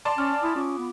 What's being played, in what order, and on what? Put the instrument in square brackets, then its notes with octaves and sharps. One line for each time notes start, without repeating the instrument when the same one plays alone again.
[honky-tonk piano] D5 A5 C6
[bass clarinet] C#4 [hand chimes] G#5 F6
[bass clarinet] E4 [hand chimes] D#6
[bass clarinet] C#4 [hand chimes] F4 D6
[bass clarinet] B3